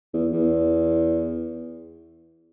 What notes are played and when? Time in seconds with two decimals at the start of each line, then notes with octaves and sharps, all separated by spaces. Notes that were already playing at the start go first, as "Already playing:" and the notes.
0.14 E2
0.33 E2